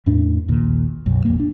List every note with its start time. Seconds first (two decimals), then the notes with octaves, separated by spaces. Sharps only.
0.06 E2 A2 C#4 D4
0.48 A#1 D#2 A#2
1.06 B1 F#2
1.25 E1 A#1 F2 A#3
1.39 D4